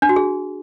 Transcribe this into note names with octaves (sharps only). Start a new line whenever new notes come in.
D4
F#4
G#4